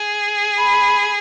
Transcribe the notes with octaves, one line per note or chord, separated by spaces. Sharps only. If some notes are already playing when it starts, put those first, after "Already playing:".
Already playing: G#4
B5